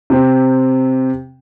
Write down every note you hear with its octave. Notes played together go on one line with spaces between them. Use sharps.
C3 C4